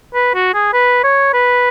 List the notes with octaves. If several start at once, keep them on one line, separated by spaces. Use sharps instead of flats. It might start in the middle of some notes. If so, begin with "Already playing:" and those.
B4
F#4
G#4
B4
C#5
B4